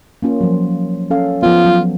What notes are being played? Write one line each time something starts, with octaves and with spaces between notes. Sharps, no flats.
A#3 C#4 F4
F3 F#3
C#4 A4 F5
F3 B3 F4
F#3